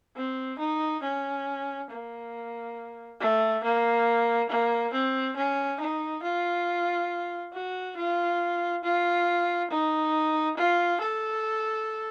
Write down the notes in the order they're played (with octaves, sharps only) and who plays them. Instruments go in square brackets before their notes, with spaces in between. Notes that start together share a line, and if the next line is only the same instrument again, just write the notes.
[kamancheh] C4
D#4
C#4
A#3
A3
A#3
A#3
C4
C#4
D#4
F4
F#4
F4
F4
D#4
F4
A4